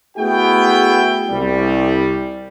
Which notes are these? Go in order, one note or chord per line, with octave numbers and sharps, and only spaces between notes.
A3 B3 E4 F#4 G#4 G5
C2 G3